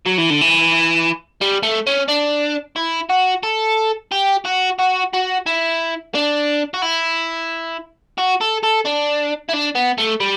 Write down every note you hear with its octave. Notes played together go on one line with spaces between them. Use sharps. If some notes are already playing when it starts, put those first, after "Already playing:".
F#3
E3
D3
E3
G3
A3
C#4
D4
E4
F#4
A4
G4
F#4
F#4
F#4
E4
D4
F#4
E4
F#4
A4
A4
D4
E4
D4
B3
A3
G3